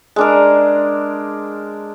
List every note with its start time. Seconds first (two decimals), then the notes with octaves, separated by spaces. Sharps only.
0.16 G#3 D4 A#4